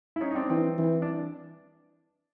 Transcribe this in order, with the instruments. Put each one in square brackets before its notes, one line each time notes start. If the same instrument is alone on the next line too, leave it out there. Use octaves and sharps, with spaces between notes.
[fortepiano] E4
C#4 D#4
D#4
C4 D4
[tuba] E3 [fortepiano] C4
[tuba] E3
[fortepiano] D4